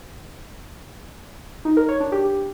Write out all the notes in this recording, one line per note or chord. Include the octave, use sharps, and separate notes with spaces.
D#4
A#4
C#5
D4
G4